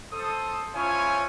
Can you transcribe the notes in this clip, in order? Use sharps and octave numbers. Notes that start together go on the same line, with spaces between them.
A4 C5 D#6
C#4 E4 F4 C5 C#5 G#5